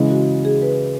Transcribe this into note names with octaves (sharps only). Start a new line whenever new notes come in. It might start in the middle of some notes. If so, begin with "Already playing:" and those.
Already playing: C#3 E3 G#3
F#4
G#4
B4